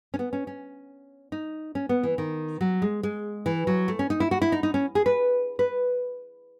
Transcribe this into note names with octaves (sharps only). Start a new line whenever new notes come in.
C#4
B3
C#4
C#4
D#4
C#4
B3
E3
D#3
F#3
G#3
G#3
E3
F#3
A3
C#4
D#4
E4
F#4
E4
D#4
D#4
C#4
G#4
B4
B4